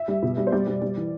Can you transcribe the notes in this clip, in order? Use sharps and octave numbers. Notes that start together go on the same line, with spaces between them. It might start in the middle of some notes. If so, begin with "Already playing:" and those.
Already playing: E5
G3
B2
G3
C5
G3 D5
G3
G3
E3